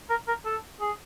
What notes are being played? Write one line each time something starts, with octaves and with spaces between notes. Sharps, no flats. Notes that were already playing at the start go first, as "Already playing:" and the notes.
A#4
A#4
A4
G#4